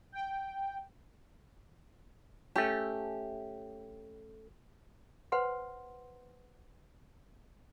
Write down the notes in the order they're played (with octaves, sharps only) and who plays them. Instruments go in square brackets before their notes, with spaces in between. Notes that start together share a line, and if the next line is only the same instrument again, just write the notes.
[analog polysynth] G5
[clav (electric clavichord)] A3 C#4 [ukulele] G4
[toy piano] B4 C5 F#5 C6